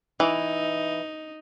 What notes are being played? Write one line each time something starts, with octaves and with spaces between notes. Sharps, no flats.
E3 D#4